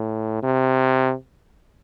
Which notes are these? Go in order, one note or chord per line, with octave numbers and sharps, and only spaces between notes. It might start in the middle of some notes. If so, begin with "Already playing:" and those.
Already playing: A2
C3